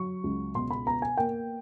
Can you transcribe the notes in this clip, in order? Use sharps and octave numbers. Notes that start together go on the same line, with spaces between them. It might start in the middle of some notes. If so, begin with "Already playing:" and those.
Already playing: F#3 C#6
C#2
B2 C6
B5
B3 A#5
G#5
A#3 G5